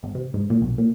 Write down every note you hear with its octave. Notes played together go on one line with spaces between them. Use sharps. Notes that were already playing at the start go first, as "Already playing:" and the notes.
G#1
C3
G#2
A#2
B1
A#2